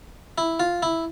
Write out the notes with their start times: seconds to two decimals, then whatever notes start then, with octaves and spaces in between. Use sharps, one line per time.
0.38 E4
0.60 F4
0.83 E4